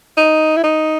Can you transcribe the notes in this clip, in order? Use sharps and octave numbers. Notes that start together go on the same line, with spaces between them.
D#4
E4
D#4